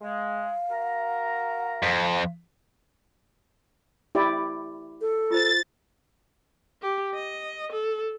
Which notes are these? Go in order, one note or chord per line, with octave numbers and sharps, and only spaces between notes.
G#3 F5
F#4 A#4 A#5
F2
E4 G4 D5
A4
F4 C5 A6
G4
D#5
A4